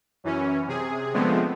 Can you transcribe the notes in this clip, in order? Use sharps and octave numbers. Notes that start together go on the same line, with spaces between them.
F#2 E3 C#4
C3 G#4
D3 F3 G#3 A3 B3 C4